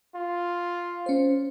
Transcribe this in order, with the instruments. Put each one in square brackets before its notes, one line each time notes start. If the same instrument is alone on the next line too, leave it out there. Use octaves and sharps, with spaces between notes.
[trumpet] F4
[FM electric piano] C#4 C5